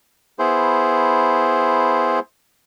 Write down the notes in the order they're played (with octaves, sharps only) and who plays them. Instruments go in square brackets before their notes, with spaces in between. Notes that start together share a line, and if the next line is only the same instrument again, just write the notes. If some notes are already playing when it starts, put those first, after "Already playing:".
[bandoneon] B3 E4 G#4 C5